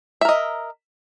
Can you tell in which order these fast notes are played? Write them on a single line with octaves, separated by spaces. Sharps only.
E5 A#4 D#5